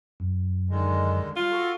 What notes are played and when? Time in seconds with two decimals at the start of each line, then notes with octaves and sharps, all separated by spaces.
0.20 F#2
0.70 D3 D#3 G#3
1.36 G3 F4
1.51 F#4 A4